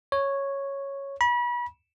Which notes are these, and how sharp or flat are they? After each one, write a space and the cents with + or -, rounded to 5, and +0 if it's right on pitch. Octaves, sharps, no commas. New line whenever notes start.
C#5 -5
B5 -35